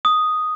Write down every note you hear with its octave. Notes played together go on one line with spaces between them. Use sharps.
D#6